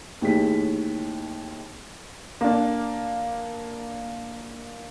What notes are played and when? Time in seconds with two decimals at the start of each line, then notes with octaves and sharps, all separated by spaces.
0.21 D#2 A2 G#4 B6
2.41 A#3 D4